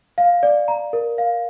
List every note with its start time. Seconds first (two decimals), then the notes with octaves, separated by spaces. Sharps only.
0.18 F5
0.43 D5
0.68 A#5
0.93 A#4
1.18 F5